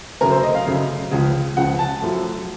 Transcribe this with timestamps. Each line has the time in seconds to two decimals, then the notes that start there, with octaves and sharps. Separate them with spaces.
0.21 F#2 C#3 A3 A#4
0.31 C5
0.43 D#5
0.55 F5
0.66 F#2 C#3 A3
1.11 C#2 C#3 F3
1.57 C#2 C#3 F3 F#5
1.79 A5
2.02 F#2 F3 A3